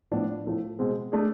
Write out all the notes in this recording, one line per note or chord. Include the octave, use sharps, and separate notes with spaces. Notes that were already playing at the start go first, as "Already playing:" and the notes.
A2 F3 B3 D4
A2 F3 A3 E4
B2 G#3 C4 G#4
A3 D4 G#4